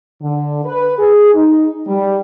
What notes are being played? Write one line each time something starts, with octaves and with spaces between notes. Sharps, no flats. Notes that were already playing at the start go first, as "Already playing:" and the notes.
D3
B4
G#4
D#4
G3